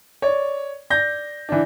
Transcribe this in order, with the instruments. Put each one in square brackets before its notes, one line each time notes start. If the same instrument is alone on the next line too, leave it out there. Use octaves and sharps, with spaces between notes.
[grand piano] C#5 D5
D5 G6 A#6
E3 D4